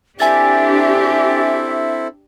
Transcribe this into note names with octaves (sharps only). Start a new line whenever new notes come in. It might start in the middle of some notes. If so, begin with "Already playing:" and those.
C4 D4 E4 G4 A4 E5 G#5 A6